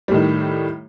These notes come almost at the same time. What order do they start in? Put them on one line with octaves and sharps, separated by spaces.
G3 A2 D#3